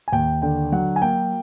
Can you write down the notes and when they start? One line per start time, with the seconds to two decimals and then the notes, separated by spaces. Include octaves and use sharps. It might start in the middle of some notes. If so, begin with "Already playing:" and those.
0.08 G#5
0.12 D#2 G5
0.42 D3 G5
0.72 F#3 F#5
0.96 G#5
1.02 A#3 G5